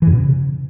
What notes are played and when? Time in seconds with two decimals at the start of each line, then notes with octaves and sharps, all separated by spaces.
0.02 E3
0.07 F#2
0.12 B2
0.17 C#3